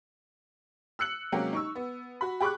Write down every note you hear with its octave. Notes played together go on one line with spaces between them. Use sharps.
E6 F#6 C#7 F#7
C3 F#3 G#3 A#3 C#4 G4
D#4 C#6 E6
B3
F#4 B5
G4 G#4 B5 C#6 D6 F#6